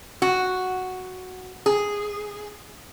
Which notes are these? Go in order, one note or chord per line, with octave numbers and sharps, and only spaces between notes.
F#4
G#4